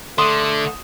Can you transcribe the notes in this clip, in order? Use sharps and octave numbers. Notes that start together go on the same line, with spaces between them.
D3 A3 C6 D#6